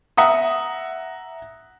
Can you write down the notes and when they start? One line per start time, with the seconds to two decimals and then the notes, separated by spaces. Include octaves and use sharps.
0.17 E5 F#5 A#5 D#6